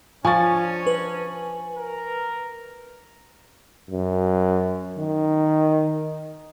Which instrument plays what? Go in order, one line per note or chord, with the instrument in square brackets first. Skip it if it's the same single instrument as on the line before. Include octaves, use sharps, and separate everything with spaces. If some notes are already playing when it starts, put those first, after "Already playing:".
[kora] F3 [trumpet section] C#4 D4 [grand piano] G#5 C#6 A6
[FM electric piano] B4
[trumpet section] A#4
[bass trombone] F#2
D#3